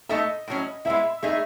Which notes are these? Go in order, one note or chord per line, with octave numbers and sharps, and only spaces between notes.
A3 D#4 A4 D#5 E5
A2 F#3 C#4
G#3 B3 E4 E5
A3 D#4 G#4 E5